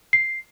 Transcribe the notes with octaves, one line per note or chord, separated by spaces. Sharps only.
C7